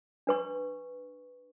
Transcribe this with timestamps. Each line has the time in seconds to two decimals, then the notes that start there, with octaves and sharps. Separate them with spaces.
0.27 D4 B4 C#6